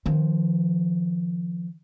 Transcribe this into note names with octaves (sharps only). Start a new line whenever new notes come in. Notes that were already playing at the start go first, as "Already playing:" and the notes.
D#3 F3